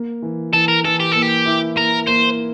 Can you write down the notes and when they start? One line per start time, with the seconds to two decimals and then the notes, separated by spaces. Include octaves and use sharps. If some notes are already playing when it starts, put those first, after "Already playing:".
Already playing: A#3
0.22 E3
0.53 E3 A4
0.68 A#4
0.84 E3 A4
1.00 G4
1.12 A#3 A4
1.22 G4
1.46 E4
1.77 A#3 A#4
2.07 A#3 C5